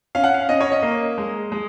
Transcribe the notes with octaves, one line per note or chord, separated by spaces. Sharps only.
C#4 F5
F#5
F5
C#4 D#5
C#5
D#5
A#3
G#3
G#3